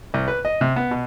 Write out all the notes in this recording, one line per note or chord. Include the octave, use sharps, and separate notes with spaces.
C2
B4
D#5
C3
B3
B2